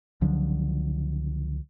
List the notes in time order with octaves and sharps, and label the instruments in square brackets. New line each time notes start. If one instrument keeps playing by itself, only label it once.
[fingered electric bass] C#2 D3 F3 F#3